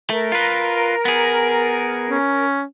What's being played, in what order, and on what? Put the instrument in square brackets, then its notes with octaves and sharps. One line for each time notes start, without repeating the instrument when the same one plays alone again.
[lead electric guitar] A3 [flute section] A#4
[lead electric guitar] F4 B4
B3 G#4
[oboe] C#4